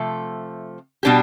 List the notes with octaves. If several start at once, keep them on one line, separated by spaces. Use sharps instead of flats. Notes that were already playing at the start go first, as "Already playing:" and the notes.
Already playing: C3 F3 A3
B2 G3 D4 G4